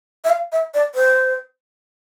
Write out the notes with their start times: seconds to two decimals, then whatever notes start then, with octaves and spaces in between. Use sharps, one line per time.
0.24 E5
0.30 F5
0.52 E5
0.74 D5
0.95 C5